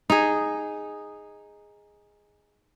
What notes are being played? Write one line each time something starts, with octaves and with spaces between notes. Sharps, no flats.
D#4 G#4